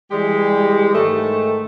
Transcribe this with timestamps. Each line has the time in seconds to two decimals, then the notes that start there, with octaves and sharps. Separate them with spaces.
0.10 E3 G3 G#3 G4
0.94 G#2 D#3 A3